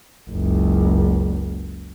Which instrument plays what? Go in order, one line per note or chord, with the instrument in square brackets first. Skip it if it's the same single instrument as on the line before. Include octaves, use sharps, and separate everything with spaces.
[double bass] F#1 C#2